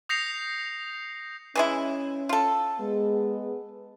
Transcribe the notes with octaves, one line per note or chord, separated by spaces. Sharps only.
D#6 G6 A#6 C7 C#7 F7
E3 G#3 C#4 E4
F4 A4
G#3 B3